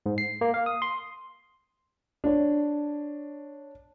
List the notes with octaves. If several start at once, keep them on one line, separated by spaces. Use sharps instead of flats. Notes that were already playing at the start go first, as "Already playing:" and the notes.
G#2
C7
A#3
F5
D#6
C6
D4 C#5